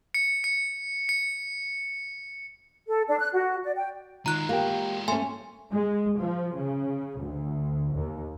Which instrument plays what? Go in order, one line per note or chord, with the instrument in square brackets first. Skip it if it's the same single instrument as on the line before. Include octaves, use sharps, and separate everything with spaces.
[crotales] C#7
C#7
C#7
[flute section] A4
D4
F#6
F#4
D5
G5
[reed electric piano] D#3 D#4 F4 [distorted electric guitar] G#3 F#4 [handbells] A#5 F#6
[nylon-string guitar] A#3 [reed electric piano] F4 G4 G5
[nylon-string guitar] A3 C#4 [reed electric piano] A#3 [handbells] G#5 C6
[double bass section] G#3
F3
C#3
D2
D#2